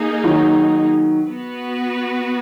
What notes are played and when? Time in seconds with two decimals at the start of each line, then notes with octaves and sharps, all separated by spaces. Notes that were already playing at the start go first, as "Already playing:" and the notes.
Already playing: A#3 D#4 G#4
0.24 D#3 F#3
1.27 B3 F#4 B4